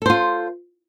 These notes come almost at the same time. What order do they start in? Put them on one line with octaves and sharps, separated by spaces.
A4 C5 F4